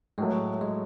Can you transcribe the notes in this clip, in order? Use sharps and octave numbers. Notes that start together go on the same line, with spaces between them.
A2 F#3 G#3 A3
G#3